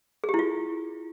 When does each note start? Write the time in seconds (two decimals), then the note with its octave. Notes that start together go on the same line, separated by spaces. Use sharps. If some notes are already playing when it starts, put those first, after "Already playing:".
0.24 G#4
0.29 G4
0.34 E4
0.39 F4